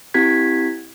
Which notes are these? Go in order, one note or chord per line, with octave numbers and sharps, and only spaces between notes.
C4 E4 G4 G#6 B6